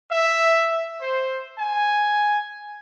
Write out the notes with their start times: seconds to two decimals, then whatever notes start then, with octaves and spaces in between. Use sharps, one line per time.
0.11 E5
1.00 C5
1.59 G#5